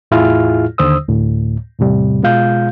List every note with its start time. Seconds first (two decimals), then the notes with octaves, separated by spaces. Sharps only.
0.11 E2 A2 E4 F4 G#4 F6
0.78 D#2 D3 C5 D#6 E6
1.08 D2 A2
1.79 E2 A2 C3 G3
2.23 B2 G#3 F4 F5 G6